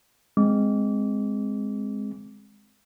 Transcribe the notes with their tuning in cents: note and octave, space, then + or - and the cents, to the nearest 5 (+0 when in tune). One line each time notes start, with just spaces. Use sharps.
G#3 +0 C4 +0 D6 -25